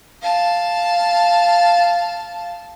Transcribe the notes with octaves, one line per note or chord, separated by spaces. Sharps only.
F5 A5